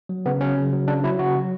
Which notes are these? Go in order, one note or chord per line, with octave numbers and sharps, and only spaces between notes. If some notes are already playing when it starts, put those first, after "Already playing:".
F#3
C#3 B3
F#3 C#4
C#3
F#3
C#3 D4
F#3 E4
C#3 F#4
F#3